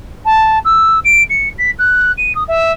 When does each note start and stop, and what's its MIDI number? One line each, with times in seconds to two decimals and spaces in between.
0.25 0.58 81
0.64 0.99 88
1.04 1.22 98
1.29 1.48 97
1.58 1.70 95
1.78 2.11 90
2.17 2.35 99
2.35 2.43 87
2.47 2.72 76